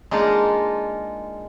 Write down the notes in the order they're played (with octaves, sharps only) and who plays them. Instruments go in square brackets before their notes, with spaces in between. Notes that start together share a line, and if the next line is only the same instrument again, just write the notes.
[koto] G#3 A#3 D4 D#4 F4